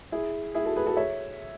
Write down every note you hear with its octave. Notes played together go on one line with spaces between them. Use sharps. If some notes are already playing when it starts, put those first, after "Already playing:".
E4 G#4
E4 G#4
F#4 A4
G#4 B4
F#4 A4
C#5 E5